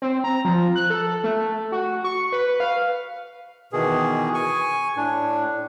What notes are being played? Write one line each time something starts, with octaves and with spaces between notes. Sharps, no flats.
C4
A#5
F3
F#6
A4
A3
F#4
C#6
B4
F5
B2 D#3 E3 G#4
G#5 C#6
A2 D4